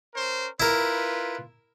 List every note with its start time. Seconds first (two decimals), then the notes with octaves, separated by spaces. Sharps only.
0.14 C#4 A#4 C5
0.60 E4 F4 A#4 B4